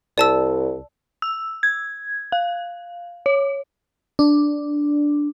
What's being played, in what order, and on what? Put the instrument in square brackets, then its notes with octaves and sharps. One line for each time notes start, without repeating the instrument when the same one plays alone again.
[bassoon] C2 [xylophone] D5 A5 E6
[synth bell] E6
G#6
F5
C#5
[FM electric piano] D4